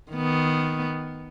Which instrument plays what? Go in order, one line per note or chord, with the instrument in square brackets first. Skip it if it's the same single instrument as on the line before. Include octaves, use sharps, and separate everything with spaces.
[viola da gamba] D#3 B3